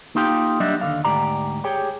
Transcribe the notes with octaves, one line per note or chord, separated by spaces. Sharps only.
A#3 D#4 F4 G4 G5
F#3 G3 D4 D#5 E5
D#2 D3 F5
D2 G#2 G4 D5 A#5
G4 G#4 C#5 G5